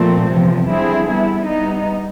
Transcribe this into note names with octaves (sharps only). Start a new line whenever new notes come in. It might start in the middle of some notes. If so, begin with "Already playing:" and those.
Already playing: A#2 F3 A3 C4
E2 C3 F3
D3 G3 C4 E4 G#4
G3 B3 E4
G3 B3 D#4